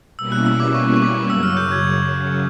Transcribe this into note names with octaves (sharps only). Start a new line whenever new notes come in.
B2 G3 A#3 C#4 E4 E6
F#6
E6
D6
C#6
C#6
D6
F#2 C#3 F#3 E6
F6
G6
G#6